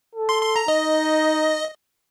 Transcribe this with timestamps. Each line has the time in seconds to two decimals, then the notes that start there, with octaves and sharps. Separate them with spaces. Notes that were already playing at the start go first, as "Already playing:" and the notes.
0.15 A4
0.29 C6
0.42 C6
0.56 A#5
0.68 D#4 D#5